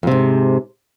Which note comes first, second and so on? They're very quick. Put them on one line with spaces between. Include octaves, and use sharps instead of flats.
F2 C3 G#2